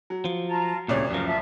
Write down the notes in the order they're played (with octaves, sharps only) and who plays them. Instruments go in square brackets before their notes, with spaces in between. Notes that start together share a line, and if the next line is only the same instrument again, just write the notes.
[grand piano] F#3
[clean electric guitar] F3
[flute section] F4 A5 A#5
[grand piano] D1 C2 D5 [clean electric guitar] A#2 C#3 [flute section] C#5
[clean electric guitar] F#2 F3 [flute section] A#4
[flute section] F4 E5 A5